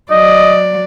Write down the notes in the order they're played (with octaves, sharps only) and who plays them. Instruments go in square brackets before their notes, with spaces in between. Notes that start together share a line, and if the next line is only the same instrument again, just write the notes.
[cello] F#3 D5 [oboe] D#5